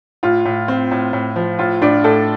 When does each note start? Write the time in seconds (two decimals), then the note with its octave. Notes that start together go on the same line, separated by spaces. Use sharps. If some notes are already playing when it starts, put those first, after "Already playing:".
0.23 A2 F4
0.45 A2
0.68 C4
0.91 A2
1.13 A2
1.36 F3
1.59 A2 F4
1.82 A2 D4
2.04 A2 A4